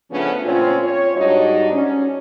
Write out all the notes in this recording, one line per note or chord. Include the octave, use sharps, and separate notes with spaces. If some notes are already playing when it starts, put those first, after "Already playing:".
C#3 F3 A3 B3 C#4 D4
A#2 C4 C#4 F4
C#5
G#2 G3 D4 D#4 F#4
C#4